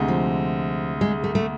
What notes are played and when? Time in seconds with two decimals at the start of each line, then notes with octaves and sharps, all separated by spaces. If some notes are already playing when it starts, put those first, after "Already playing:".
Already playing: D2 C3 G#3
0.08 F3
1.01 G#3
1.24 A3
1.35 A3